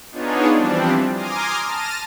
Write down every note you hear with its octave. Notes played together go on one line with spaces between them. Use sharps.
B3 D4 D#4 F4 G#4 C#5
E3 F3 G3 C4 D4
G#5 A#5 C6 D6 D#6 F6
A5 F6 A#6 D#7